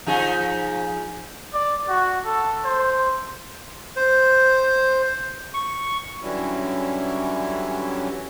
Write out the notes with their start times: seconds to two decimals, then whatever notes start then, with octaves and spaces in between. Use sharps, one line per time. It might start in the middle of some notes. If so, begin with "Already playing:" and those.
0.06 F3 D#4 G#4
1.54 D5
1.88 F#4
2.25 A4
2.65 C5
3.96 C5
5.54 C#6
6.22 D3 E3 F#3 G3 C#4 E4